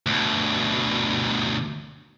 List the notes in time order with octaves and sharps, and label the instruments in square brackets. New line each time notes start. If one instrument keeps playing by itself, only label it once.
[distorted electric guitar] D2 B2